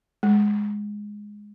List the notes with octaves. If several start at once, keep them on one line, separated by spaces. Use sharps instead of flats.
G#3